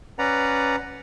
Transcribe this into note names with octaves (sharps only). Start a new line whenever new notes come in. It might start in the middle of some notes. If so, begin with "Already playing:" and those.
C#4 B4 D5 F#5 A#5